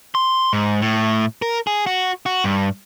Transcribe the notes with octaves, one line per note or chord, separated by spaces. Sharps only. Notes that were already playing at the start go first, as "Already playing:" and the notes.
C6
G#2
A2
A#4
G#4
F#4
F#4
G2